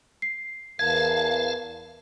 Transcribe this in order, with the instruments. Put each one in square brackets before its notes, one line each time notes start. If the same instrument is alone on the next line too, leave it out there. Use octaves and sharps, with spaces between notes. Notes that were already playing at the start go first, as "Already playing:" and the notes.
[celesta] C7
[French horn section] E2 A#4 [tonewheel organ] F5 A5 [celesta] G#6